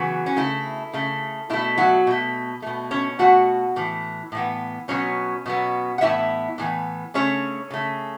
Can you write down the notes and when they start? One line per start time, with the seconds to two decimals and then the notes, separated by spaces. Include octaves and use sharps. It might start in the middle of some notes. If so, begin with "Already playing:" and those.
Already playing: C#3 E3 F#3 B3 F#4
0.26 C#4
0.36 C#3 A3 E4
0.93 C#3 A3
1.50 B2 A3 E4
1.78 F#3 F#4
2.07 B2 A3
2.62 B2 A3
2.91 C#4 C#5
3.19 B2 A3 F#4 F#5
3.76 A2 E3
4.32 A2 E3 B3
4.88 B2 F#3 B3 C#4 C#5
5.46 B2 F#3 B3
5.98 F#5
6.01 A2 E3 B3 E4 E5
6.58 A2 E3 B3
7.14 C#3 A3 C#4 C#5
7.70 C#3 A3